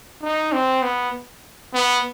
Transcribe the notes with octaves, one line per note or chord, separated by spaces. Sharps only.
D#4
C4
B3
B3